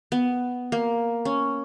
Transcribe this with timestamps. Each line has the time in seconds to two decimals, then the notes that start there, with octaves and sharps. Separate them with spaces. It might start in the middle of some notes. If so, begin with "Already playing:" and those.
0.12 B3
0.72 A#3
1.25 C#4